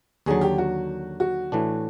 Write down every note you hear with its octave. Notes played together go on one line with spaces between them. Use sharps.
D#2 D3 F#3 G#4
G4
F#4
F#4
A2 E3 A3 D4